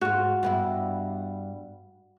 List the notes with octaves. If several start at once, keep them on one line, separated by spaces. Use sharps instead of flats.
G#2 F4 F#4
G2 B3 E4